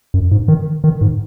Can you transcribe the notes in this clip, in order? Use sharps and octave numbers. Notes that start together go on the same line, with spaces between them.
F#2
G#2
D#3
D#3
G#2